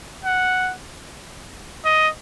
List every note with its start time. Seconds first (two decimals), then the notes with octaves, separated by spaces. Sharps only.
0.25 F#5
1.85 D#5